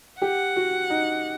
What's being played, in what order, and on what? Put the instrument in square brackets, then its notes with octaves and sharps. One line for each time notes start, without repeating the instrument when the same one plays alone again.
[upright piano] G4 [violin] F#5
[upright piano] F#4
D#4